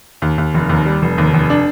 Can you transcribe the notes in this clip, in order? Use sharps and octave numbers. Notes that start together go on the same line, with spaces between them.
D#2
D#2
F1
D#2
G3
F1
D#2
F1
D4